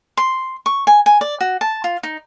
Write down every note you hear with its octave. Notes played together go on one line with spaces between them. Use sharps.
C6
C#6
G#5
G#5
D5
F#4
A5
F4
D#4